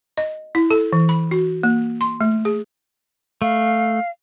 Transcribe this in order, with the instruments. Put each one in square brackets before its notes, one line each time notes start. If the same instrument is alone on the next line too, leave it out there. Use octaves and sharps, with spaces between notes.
[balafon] D#5
E4
A4
E3
B5
F#4
A#3
C6
A3
G#4
[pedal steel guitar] A3 [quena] F5